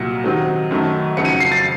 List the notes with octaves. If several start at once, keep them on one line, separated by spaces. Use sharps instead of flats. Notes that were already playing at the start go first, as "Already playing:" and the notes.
Already playing: C2 A#2 F#3 C#7
C3 D#3 F#3 C4 D#4
F#2 D#3 F#3 A3
F2 C#3 F#3 C#7
D#7
C#7
C7
A6